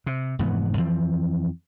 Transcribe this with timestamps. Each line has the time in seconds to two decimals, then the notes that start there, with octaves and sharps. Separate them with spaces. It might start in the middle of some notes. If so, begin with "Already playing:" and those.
0.06 C3
0.39 F1 G#2 E3 B3
0.77 F2 E3 F3 C4